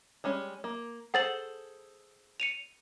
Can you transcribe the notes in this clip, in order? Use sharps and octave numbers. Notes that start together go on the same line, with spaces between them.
G3 G#3 C#4
A#3
G#4 A4 C5 F#5 A6 F#7
C#7 D#7 F7